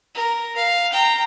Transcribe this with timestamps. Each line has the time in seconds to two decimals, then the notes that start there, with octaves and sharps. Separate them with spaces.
0.14 A#4
0.56 F5
0.92 G5 A#5